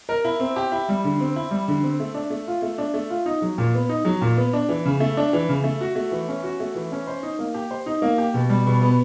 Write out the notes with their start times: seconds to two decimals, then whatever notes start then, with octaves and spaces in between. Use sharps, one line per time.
0.09 A#4
0.25 E4
0.40 C4
0.56 G4
0.72 E4
0.89 G3
1.04 D3
1.20 C4
1.36 E4
1.51 G3
1.68 D3
1.83 C4
2.00 A3
2.14 D4
2.30 A3
2.47 F4
2.62 A3
2.78 D4
2.94 A3
3.10 F4
3.26 D#4
3.42 F#3
3.58 A#2
3.74 B3
3.89 D#4
4.05 F#3
4.22 A#2
4.37 B3
4.53 D4
4.69 E3
4.85 C#3
5.00 A3
5.17 D4
5.33 E3
5.49 C#3
5.64 A3
5.81 F#4
5.95 A3
6.11 E3
6.28 C#4
6.43 F#4
6.60 A3
6.75 E3
6.92 C#4
7.07 C5
7.23 D#4
7.39 A#3
7.54 G4
7.71 C5
7.86 D#4
8.02 A#3
8.18 G4
8.34 B2
8.49 G3
8.66 B2
8.81 B3